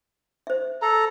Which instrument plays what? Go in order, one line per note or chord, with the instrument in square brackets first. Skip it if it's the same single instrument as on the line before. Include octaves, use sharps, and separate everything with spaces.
[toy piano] C5 E5
[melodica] A4 A#5